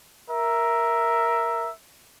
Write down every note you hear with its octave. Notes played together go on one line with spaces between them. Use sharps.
A#4 E5